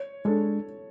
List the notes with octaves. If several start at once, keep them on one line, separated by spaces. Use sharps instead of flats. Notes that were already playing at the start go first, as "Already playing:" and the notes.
Already playing: C#5
G#3 D4 A4